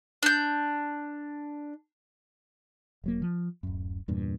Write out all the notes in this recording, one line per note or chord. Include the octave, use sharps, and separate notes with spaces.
D4 G6
E1 F#3 A#3
F3
D1 F#2
E2 G2 A#2